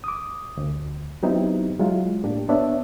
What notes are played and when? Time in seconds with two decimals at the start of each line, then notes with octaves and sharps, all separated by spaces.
0.04 D6 D#6
0.57 D2
1.23 F#3 B3 C4 D#4 E4 G4
1.79 F#3 G#3 E4 F4
2.24 A2 A#3 D4 G4
2.49 B3 D4 C#5 E5